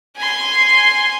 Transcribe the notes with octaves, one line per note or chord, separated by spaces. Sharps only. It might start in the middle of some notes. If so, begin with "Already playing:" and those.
G#5 C6